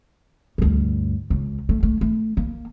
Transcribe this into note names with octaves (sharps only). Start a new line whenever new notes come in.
D2 G2
C#2
A3
A3
A3
A#3